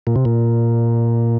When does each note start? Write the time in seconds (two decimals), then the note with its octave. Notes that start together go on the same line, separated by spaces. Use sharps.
0.07 A#2
0.16 C3
0.25 A#2